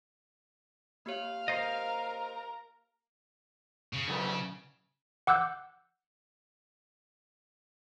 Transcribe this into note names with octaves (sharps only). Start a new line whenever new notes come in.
A#3 G4 C#5 F5
A#4 C5 D#5 A#5
C#3
D3 F#3 B4
F#5 D6 E6 F#6 G6